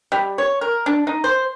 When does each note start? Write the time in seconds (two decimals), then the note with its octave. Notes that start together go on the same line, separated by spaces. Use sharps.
0.12 G3
0.38 C#5
0.61 A#4
0.86 D4
1.07 D#4
1.24 C5